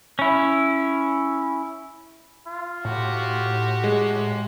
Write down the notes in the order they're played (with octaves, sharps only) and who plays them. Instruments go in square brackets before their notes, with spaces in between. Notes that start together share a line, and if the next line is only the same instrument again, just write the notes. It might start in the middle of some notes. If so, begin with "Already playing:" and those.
[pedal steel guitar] C#4 E4
[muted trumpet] F4
[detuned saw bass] A2 [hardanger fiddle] F#4 G4
[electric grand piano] G#3